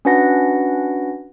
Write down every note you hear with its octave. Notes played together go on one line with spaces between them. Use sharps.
C#4 D4 F#4 B4 F#5 A#6